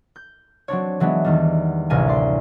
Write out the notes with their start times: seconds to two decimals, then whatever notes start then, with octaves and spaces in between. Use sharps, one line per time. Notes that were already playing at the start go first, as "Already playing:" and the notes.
0.16 G6
0.68 F#3 C4 D4 C#5
1.00 E3 F#3 G#3 B3 D4
1.24 E2 D#3 G3
1.90 A1 D2 C3 A#4 G#5
2.08 D5 C6